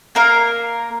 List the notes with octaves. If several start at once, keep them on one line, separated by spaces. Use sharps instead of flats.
A#3 A#4 F5